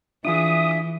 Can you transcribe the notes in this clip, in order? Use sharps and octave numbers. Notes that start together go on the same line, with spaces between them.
E3 D4 F4 G#4 E5 D#6